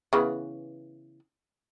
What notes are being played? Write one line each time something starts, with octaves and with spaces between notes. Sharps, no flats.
C#3 E3 B3